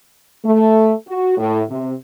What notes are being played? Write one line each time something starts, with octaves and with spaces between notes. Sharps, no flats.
A3
F#4
A2
C3